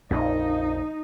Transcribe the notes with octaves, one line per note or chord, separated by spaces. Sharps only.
A#1 F2 A#2 D#4